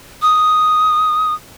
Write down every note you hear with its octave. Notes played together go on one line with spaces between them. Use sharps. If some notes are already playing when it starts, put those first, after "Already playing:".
D#6